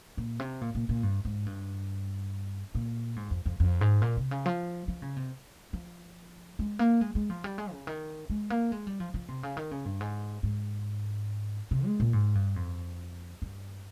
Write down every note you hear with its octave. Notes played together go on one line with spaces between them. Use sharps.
A#2
C3
A#2
A#2
A#2
G2
G#2
G2
A#2
G#2
F2
F2
F2
G#2
A#2
C3
C#3
F3
F3
C#3
C3
F3
G#3
A#3
G#3
G#3
F3
G3
G#3
C#3
D#3
G#3
A#3
G#3
G3
F3
F3
C3
C#3
D#3
C#3
G2
G#2
G#2
C3
G#3
A#2
G#2
G2
F2
G2